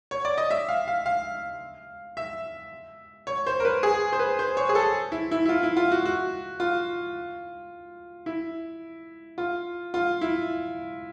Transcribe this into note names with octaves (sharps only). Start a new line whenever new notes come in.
C#5
D5
D#5
E5
F5
F5
F5
E5
C#5
C5
A#4
B4
G#4
C5
B4
C5
C#5
G#4
A4
E4
E4
E4
F4
E4
F4
F#4
F#4
F4
E4
F4
F4
E4